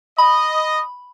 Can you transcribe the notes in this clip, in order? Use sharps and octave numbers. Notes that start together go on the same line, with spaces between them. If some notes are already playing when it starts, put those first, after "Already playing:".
D#5 B5